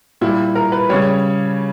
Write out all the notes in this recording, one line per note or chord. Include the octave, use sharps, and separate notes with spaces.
A#2 G3 E4
A#4
B4
C#3 G3 C#5